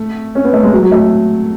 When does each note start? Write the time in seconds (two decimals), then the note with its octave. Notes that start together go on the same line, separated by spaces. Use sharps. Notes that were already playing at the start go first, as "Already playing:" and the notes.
Already playing: A3
0.35 C#4
0.44 B3
0.53 A3
0.64 G#3
0.72 F#3
0.82 F#3
0.92 A3